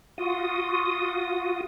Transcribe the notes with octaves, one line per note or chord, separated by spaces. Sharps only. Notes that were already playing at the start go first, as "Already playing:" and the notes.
F4 F#4 D#6